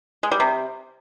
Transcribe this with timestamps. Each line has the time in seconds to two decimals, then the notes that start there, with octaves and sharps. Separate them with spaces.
0.23 G#3
0.31 G3
0.40 C3